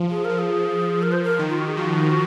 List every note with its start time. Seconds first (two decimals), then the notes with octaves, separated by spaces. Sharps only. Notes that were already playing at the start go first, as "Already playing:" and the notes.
Already playing: F3
0.10 G#4
0.24 F3 A#4
0.38 G#4
1.02 A#4
1.12 C5
1.23 A#4
1.39 D#3
1.49 F4
1.58 F#4
1.68 G#4
1.77 F3 F#4